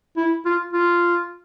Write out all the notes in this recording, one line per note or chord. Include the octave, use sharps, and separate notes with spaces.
E4
F4
F4